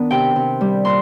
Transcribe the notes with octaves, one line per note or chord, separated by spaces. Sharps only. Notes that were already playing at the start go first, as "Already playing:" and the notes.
Already playing: D#3 B3 D4
C3 G5
C3
G3
A#2 C6